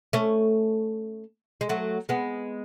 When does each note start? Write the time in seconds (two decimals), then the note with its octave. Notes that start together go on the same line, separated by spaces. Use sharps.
0.13 A3 C#4
1.61 G#3
1.69 F#3 A3
2.09 G#3 B3